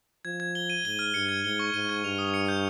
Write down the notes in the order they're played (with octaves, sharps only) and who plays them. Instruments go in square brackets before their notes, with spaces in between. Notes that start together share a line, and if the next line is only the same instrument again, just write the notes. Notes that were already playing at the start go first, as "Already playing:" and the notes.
[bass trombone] F3 [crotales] G#6
[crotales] G#6
G7
D#7
[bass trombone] G#2 [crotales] G7
[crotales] F6
[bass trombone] G2 [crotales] C#7
[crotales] G#6
[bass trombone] G#2 [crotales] G7
[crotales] C#6
[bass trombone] G#2 [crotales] D#7
[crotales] G#6
[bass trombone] G2 [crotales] F7
[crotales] D#6
C#7
G6